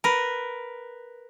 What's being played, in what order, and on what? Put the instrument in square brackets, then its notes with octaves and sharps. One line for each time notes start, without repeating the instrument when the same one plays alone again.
[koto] A#4 B4